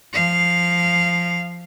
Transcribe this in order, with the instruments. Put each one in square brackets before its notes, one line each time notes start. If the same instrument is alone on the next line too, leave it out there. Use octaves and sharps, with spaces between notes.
[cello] F3 F5